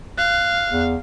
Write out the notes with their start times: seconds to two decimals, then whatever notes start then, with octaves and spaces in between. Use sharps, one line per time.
0.18 F5 F#6
0.70 E2